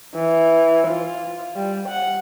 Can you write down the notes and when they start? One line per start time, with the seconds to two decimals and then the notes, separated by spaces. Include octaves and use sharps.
0.15 E3
0.87 F4
1.56 G3
1.88 F#5